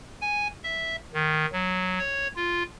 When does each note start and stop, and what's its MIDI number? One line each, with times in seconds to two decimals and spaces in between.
0.21 0.48 80
0.63 0.96 76
1.14 1.46 51
1.52 1.99 54
1.99 2.28 73
2.36 2.63 65